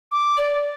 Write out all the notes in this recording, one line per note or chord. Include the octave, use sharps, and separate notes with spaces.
D6
D5